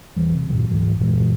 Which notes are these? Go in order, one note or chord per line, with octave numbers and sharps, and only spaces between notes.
E1 D#2 E3 G3
C3
F#2 A#2 D#3 F#3
D1 G#2 E3 F#3
F#2 A#2 E3 G#3